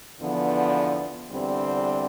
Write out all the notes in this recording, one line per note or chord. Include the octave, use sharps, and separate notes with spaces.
E2 D3 F3 B3
E2 D3 G3 C4